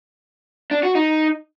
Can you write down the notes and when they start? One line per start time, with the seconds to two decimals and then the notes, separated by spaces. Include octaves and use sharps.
0.71 D4
0.83 F#4
0.95 D#4